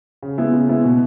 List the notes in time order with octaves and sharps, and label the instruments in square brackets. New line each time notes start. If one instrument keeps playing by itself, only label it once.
[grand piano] C#3
G#3 B3 E4
C#3
G#3 B3 E4
B2